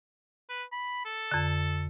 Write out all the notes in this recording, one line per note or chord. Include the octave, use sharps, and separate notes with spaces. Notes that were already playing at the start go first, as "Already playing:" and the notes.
B4
B5
A4
F2 D3